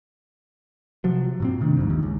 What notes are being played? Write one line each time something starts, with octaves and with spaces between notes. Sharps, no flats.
C3 F3 F#3
G2 A#2 C4
C3 D#3 A3 D4
G#1 F2 G#2
D#2
C#2